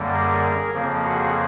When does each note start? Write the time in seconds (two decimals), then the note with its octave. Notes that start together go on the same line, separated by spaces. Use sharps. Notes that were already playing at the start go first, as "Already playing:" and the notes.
Already playing: F#2 D3 G3 A#3
0.12 G#4 A#4
0.73 F2 C#3 F3 A#3
1.04 F#4 G#4